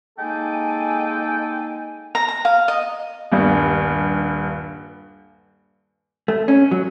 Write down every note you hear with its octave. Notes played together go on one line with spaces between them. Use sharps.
G#3 A#3 D#4 A4 G5 G#5
A#5
A#5
F5
D#5
D#1 G2
A3
C#4
F#3